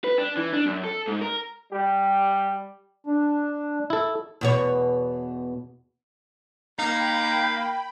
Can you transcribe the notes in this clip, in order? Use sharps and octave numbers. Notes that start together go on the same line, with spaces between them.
B4
D4
E3
D4
F#2
A4
G#2
A#4
G3 G4
D4
E4 A4
E2 B2 C#5
A#3 D#4 F5 G5 B5